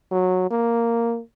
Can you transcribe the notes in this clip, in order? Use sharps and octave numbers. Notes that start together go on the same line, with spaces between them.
F#3
A#3